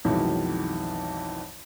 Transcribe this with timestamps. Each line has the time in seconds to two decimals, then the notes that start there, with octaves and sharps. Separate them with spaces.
0.05 B1 F2 D#3 E3 F#3 G#3